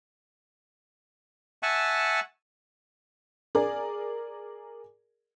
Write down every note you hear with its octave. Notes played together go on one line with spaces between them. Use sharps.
E5 F#5 G#5 A5 C#6
G#4 A#4 D5